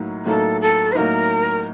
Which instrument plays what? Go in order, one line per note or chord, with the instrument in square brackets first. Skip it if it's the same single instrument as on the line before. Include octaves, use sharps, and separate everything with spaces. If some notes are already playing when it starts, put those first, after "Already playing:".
Already playing: [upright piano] A2 F#3 A#3 D#4
[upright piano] A2 F#3 A#3 D#4 [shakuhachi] A4
[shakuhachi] A4
C5
[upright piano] A2 F#3 A#3 D#4 [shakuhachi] A#4